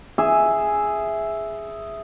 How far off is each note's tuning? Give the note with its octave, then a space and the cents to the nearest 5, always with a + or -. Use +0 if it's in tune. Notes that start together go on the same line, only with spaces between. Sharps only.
G#4 +0 E5 +0